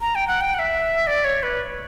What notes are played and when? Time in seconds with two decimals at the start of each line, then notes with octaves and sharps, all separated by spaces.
0.01 A#5
0.15 G5
0.28 F#5
0.41 G5
0.54 F#5
0.59 E5
1.07 D5
1.24 C#5
1.43 B4